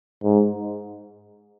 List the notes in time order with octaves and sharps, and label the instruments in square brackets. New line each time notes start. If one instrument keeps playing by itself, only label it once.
[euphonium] G#2